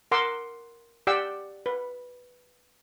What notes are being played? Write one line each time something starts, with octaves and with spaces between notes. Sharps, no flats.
A#4 F#5 C6 D6 E6
G4 D5 F#5 G5 E6
B4